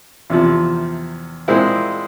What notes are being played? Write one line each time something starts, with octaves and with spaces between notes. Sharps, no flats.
E2 C3 F3
A#2 G#3 C4 E4